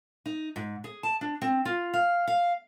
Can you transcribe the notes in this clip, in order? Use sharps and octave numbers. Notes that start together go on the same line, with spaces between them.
D#4
G#2
G#4
A5
D4
C4
F4
F5
F5